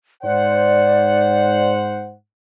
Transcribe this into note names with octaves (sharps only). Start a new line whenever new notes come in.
G#2 C5 D5 F#5